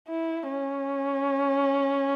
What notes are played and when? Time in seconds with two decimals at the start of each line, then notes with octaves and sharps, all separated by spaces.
0.08 E4
0.49 C#4